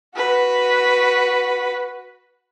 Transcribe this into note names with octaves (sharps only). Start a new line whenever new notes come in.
F#4 B4